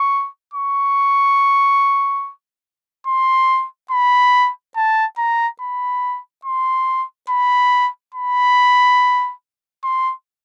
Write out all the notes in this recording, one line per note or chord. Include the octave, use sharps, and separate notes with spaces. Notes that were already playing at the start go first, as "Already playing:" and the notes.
Already playing: C#6
C#6
C6
B5
A5
A#5
B5
C6
B5
B5
C6